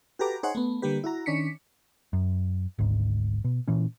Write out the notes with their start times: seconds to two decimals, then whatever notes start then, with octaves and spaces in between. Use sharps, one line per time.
0.19 F#4 G4 A4 B4 A#5 D6
0.43 D#4 G#4 C5 C#5 F#5
0.55 A3 B3
0.82 D3 G3 A#3 G4 B4
1.04 E4 F#4 A#5
1.26 D#3 C#4 D4 B6 C#7
2.13 F#2
2.78 G#1 D2 G#2
3.44 B2
3.68 A#2 E3 C#4